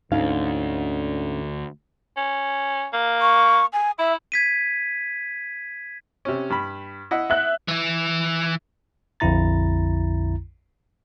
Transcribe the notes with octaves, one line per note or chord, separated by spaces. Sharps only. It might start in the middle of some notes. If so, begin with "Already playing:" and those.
D2 G#2 D3 C#4 D#4 F5
C#4
A#3
C#6
G#5
E4 E5
G#6 B6 D#7
C3 C#4
G2 B5
E4 D#5 F#5
E5 F#6
E3 E4
A#1 F2 D3 E4 A#5 A6